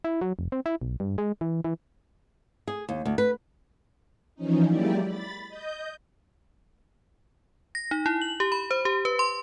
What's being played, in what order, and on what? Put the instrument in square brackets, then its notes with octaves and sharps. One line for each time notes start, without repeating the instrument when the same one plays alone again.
[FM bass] E4
F#3
F1
C4
E4
B1
G2
G#3
E3
E3
[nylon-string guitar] G#4
D#2
D2
B4
[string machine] E3 F3 C#4 D#4
F#3 G#3 A#3 E4 G4 D5
B5 A6
D#5 G6
[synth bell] A#6
D#4
E4
F#7
G4
B5
C5
G4
B4
C6